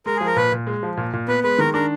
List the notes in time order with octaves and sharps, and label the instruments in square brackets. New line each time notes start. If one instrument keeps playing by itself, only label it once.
[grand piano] G#3 [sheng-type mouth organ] A#4
[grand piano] F3 [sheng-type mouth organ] G#4
[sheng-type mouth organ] A#4
[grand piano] A#2 [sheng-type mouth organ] B4
[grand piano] A#2
G#3
F3
A#2
A#2
[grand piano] B3 [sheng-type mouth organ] B4
[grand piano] G#3 [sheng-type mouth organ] B4
[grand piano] D#3 [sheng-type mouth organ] A#4
[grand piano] D4 [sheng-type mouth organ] A#4